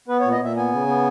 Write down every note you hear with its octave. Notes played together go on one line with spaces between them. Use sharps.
B3 B4
C#5
A#2
D#5
A#2 E5
B3 G#5
C#3
B3